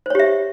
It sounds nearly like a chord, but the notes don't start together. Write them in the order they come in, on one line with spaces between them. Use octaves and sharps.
C5 C#5 G4 E5